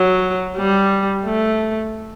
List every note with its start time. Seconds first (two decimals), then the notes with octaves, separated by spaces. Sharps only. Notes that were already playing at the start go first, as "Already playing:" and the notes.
Already playing: F#3
0.57 G3
1.26 A3